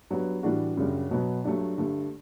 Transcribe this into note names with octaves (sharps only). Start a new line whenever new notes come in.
G2 F#3 B3
A2 E3 G3 D4 F#4
F#2 C#3 G3
B2 F#3 B3
G2 F#3 A3 D4
G2 D3 A3